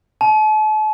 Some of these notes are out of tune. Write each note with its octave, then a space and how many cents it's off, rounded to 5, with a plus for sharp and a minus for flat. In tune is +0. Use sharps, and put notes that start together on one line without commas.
A5 -40